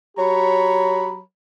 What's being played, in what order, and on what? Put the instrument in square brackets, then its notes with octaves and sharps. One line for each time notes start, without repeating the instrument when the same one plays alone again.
[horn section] F#3 G4 C#5 A#5 B5